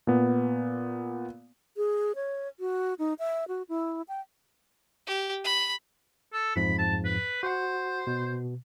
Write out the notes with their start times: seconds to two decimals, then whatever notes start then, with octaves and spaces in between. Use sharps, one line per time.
0.07 A#2 B3
1.77 G#4
2.15 C#5
2.60 F#4
2.99 D#4
3.19 E5
3.48 F#4
3.69 E4
4.08 G5
5.07 G4
5.45 B5
6.33 A4
6.56 F2 G#2 F3 B5
6.79 A5
7.05 B4
7.43 F#4 C5 F#5
8.07 B2